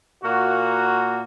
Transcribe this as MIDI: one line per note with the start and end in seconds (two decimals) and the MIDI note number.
0.24 1.22 46
0.24 1.22 58
0.24 1.22 66